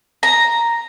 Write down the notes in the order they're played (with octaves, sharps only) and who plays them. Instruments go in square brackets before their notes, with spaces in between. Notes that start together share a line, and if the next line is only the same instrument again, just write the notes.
[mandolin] A#5